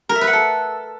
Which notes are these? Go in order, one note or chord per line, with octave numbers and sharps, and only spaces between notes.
A#4
E5
B4
F#5
A4